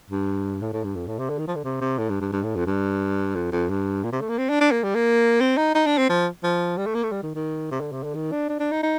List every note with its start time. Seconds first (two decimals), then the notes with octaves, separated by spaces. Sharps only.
0.10 G2
0.61 A2
0.73 A2
0.84 G2
0.95 F2
1.07 A2
1.18 C3
1.29 D3
1.38 D#3
1.47 F3
1.55 D3
1.64 C3
1.81 C3
1.98 A2
2.09 G2
2.21 G2
2.32 G2
2.43 A2
2.55 F2
2.66 G2
3.35 F2
3.52 F2
3.69 G2
4.04 A#2
4.12 C3
4.21 A3
4.29 A#3
4.38 C4
4.49 D4
4.61 D4
4.71 A#3
4.83 G3
4.95 A#3
5.40 C4
5.57 D#4
5.75 D#4
5.86 D4
5.97 C4
6.09 F3
6.43 F3
6.77 G3
6.86 A3
6.95 A#3
7.03 A3
7.12 G3
7.23 D#3
7.35 D#3
7.71 C3
7.80 D3
7.92 C3
8.03 D3
8.15 D#3
8.32 D4
8.49 D4
8.59 D4
8.72 D#4
8.83 D#4